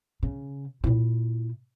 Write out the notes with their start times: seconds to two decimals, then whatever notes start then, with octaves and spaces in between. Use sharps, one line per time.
0.23 C#3
0.84 A#2 E4